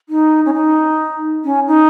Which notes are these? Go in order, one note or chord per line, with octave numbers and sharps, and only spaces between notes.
D#4
C#4
D#4
C#4
D#4